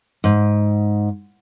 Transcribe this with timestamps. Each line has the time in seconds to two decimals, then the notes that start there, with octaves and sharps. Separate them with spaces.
0.24 G#2